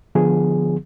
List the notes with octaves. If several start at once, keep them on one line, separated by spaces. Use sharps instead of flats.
D3 F3 B3 G#4